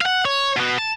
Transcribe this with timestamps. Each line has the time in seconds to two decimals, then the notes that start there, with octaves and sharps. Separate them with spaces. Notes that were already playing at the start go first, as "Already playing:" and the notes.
0.01 F5 F#5
0.25 C#5
0.57 B2 B3
0.79 A5